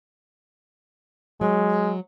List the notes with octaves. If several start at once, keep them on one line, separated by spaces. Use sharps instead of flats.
F#3 G#3